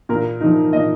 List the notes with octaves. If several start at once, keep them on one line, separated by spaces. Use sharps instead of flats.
A#2 A#4
F3 A#3 D#4
A#2 D#5